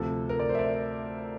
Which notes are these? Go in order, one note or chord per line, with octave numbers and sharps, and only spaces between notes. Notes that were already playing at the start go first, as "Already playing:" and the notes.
Already playing: D2 C3 F3 A4
A#4
D5
C5
E5
D5